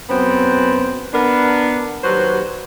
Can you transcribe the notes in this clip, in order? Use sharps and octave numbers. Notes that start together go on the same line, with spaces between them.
F#2 B3 C4
B3 D4 A#4
D#2 F#3 G3 F#4 B4 C5